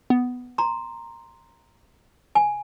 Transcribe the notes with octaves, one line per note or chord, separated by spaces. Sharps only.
B3
A#5 C6
G#5